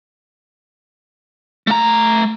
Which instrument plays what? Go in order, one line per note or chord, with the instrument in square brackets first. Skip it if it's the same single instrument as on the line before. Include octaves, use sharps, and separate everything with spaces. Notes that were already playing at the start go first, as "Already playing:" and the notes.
[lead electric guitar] A3 A#5